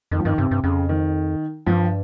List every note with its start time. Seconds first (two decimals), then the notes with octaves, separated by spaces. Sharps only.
0.12 F2 D#3
0.20 F3
0.25 G2 D#3
0.38 G2 C3
0.51 G2
0.64 F2 C#3
0.89 D#3
1.66 G2 F3